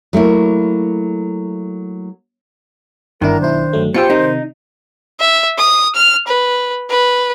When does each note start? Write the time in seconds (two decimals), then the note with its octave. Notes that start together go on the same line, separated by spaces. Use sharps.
0.13 F#3 A3 A#3 E4
3.22 G1 D#3 D4 E4 A#4
3.41 B1 E4 C5
3.73 G1 F#3 A3
3.94 B2 F4 G4 C5 E6 G6 C#7
4.10 C3 D#3 D#4
5.20 E5
5.58 D#6
5.95 F6
6.27 B4
6.90 B4